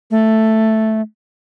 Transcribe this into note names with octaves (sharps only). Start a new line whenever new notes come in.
A3